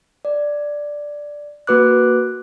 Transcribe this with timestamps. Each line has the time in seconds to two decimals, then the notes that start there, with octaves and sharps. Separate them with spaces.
0.25 D5
1.67 A#3 F#4 B4 D6 F#6